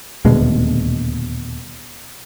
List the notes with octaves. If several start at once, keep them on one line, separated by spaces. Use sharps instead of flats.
D#1 D2 B2 G#3